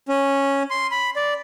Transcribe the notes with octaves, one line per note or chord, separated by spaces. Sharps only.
C#4
C6
B5
D5